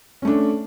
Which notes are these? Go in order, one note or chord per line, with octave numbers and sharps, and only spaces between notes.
A3 C#4 D4